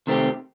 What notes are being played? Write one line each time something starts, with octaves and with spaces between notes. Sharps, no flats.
C3 D#3 A3 C4 G4